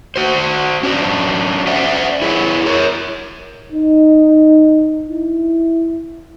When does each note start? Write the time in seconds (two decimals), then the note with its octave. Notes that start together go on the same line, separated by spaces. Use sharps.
0.16 F#4 C5
0.83 C#4 D4 F#4
1.67 C5 D5 E5 F#5
2.22 E4 G#4 C#5
2.66 A#4 C#5
3.72 D#4
5.09 E4